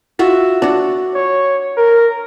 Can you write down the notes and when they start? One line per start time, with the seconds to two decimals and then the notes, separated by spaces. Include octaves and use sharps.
0.19 F4 F#4 E5
0.62 D4 F#4
1.15 C#5
1.77 A#4